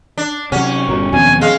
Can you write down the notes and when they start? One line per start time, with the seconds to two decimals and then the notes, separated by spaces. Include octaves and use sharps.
0.18 D4
0.52 C3 F#3 C#4 F#5
0.88 G1 A#2 F#4 A#5
1.12 D#2 B2 F3 F#3 C4 G#5
1.41 G#3 F5